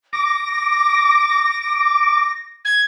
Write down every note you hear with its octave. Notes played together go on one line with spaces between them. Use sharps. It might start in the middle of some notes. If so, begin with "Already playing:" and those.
D6 A#6
G#6